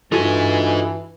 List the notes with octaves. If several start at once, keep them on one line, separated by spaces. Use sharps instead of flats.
G2 E3 D#4 F4 F#4 A4 G#5